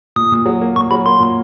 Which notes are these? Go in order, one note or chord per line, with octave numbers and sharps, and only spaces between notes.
A#2 D#6
A#2
F#3
A#3
A#2 C#6
F#3 B5
A#3 C6
A#2